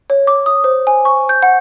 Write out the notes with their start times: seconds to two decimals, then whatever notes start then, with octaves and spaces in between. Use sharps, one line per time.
0.10 C#5
0.27 D6
0.46 D#6
0.64 C5
0.87 G#5
1.05 C#6
1.29 G6
1.43 F#5